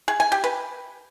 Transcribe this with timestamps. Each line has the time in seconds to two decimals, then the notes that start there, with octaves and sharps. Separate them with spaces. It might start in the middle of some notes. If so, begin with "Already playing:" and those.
0.08 G#4
0.20 G#5
0.32 G4
0.44 B4